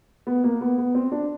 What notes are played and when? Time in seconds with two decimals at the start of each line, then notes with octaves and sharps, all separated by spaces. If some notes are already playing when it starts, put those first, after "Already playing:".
0.27 B3
0.44 A#3
0.61 B3
0.78 B3
0.95 C4
1.12 D4